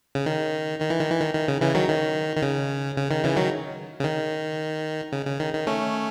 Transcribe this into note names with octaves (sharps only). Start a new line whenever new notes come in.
C#3
D#3
D#3
E3
D#3
E3
D#3
D#3
C#3
C#3 E3
D#3 F#3
D#3
D#3
C#3
C#3
D#3
C#3 E3
D#3 F#3
C#3
D#3
C#3
C#3
D#3
D#3
A3 C#4